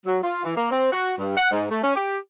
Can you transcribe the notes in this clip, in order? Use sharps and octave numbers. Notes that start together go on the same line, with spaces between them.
F#3
F4
E3
A#3
C4
F#4
G2
F#5
G#2
A3
C#4
G4